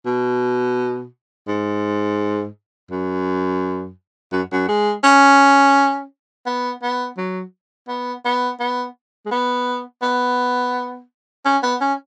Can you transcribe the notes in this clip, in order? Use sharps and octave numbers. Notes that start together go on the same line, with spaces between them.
B2
G#2
F#2
F#2
F#2
G#3
C#4
B3
B3
F#3
B3
B3
B3
G#3
B3
B3
C#4
B3
C#4